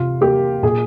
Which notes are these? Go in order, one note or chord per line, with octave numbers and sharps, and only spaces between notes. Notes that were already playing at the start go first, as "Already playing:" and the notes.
Already playing: C3 F4
A#3 G4
A#2 G#4